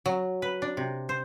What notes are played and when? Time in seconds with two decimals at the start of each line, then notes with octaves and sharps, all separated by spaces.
0.06 F#3
0.42 B4
0.62 D4
0.77 C3
1.09 C5